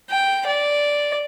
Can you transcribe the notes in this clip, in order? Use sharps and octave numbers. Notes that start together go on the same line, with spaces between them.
G5
D5